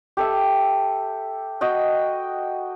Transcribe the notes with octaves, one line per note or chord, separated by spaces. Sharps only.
G4 A4 E5
F#4 D#5 G5